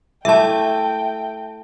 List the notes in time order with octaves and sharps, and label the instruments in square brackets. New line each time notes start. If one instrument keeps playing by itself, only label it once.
[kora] A3 E4 A4 [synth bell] E5 A5 [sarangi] G5